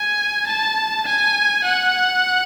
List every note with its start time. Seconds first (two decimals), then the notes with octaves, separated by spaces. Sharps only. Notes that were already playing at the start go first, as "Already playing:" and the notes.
Already playing: G#5
0.47 A5
1.06 G#5
1.64 F#5